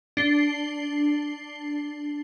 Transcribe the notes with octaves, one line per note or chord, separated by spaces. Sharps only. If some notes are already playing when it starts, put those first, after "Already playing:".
D4 C7 G7